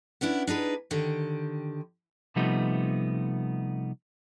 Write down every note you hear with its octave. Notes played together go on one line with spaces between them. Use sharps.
B3 C#4 D4 E4
D4 D#4 G#4 B4
D3 D#3 G4
C3 F3 G3 A3 B3 D#4